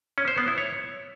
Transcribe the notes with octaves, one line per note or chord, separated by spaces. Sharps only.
C#4
C5
B3
E4
C#5